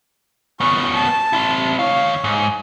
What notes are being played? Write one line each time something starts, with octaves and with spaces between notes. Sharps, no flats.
B3 C#4 C#6
A5
C4 E4
D#2 C#5 F5
G#2